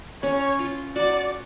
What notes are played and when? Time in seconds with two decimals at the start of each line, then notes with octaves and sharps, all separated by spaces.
0.23 C#4 C#5
0.59 F4
0.95 F#4 D5